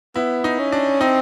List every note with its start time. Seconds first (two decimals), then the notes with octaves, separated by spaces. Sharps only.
0.16 B3 E4
0.44 D#4
0.59 C#4
0.72 D4
1.01 C4 D#4